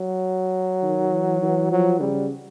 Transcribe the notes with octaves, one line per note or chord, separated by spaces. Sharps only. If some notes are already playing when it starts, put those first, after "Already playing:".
Already playing: F#3
D#3
E3
E3
F3 F#3
C#3 G3